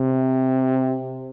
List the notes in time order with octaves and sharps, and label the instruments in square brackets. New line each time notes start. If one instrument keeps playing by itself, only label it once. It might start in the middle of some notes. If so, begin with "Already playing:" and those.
Already playing: [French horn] C3